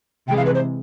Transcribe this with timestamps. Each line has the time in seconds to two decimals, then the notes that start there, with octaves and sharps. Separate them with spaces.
0.27 C3 E3 G#3 G5
0.37 F5
0.46 B4
0.55 C5